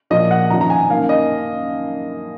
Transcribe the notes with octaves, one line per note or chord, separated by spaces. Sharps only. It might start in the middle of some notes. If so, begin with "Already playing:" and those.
A#1 A#2 F3 A#3 D#5
F#5
G#1 F#2 F3 A#5
A#5
G#5
F#2 D#3 A#3 F5
D#5